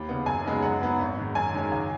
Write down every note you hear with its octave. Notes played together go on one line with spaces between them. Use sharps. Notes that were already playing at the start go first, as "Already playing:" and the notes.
Already playing: D#2 B5
C#3 B3
F#2 G#5
C#3 G#3 B3 D#4
F#2 F#5
F#3 B3 D#4
G#1
G#2 D#3
F#2 G#5
D#3 G#3 C#4
C#2